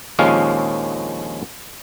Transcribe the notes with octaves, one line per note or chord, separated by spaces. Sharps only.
A#1 D#2 F3 G#3 C#4 F5